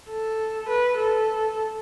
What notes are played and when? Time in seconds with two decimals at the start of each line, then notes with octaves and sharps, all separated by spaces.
0.10 A4
0.69 B4
0.98 A4